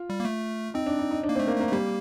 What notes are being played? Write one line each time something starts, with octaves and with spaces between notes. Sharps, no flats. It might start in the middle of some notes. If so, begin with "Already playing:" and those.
Already playing: F4
G3
A#3
A3
C4 D#4
D4
D#4
D#4
D4
A#3
A3 C4
A#3
A3
A#3
A3
G3 A#3